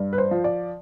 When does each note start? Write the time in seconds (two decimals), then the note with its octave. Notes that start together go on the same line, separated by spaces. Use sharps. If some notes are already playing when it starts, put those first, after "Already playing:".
Already playing: G2
0.13 B4
0.18 C5
0.31 F3
0.44 D5